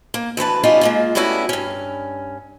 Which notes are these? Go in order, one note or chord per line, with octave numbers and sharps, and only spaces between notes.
A#3
D2 E3 B4 A5
G3 B3 C#4 D#4 F4
G#3 A#3 F4
G3 A3 B3 C#4 E4 F#4
G2 C#4